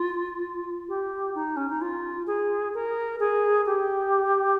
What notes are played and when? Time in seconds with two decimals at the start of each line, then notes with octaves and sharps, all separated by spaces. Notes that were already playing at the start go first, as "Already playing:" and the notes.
Already playing: F4
0.89 G4
1.35 D#4
1.56 C#4
1.69 D#4
1.82 F4
2.27 G#4
2.74 A#4
3.20 G#4
3.66 G4